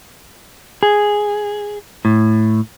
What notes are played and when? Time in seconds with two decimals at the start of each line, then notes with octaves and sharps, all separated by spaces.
0.83 G#4
2.05 A2